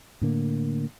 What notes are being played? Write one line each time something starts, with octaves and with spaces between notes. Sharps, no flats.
A2 D3 A#3